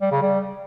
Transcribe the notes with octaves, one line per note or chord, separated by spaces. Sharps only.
G3
C#3
G3